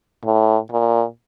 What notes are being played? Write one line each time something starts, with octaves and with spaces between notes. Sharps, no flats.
A2
A#2